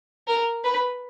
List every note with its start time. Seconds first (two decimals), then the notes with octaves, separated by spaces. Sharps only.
0.27 A#4
0.64 B4